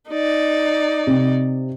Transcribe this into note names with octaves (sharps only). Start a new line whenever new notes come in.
D#4 D5
C3